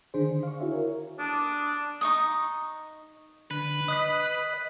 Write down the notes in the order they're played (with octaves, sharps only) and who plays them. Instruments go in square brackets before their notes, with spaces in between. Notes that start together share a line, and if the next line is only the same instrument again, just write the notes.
[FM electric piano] D3 D#3 D4 G#4 C5
F5 C#6
E4 F#4 G#4 C#5 E5
A#4 C#5
[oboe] D4 [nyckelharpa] D6 D#6
[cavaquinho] D#4 C#6 D#6
[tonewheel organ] D3 [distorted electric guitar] B4
[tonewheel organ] D#5 [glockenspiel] D#6 F#6 B6